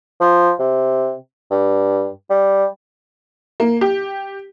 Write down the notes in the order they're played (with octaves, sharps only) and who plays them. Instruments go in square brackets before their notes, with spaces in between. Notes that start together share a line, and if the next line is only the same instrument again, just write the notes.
[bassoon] F3
C3
G2
G3
[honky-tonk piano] A#3
G4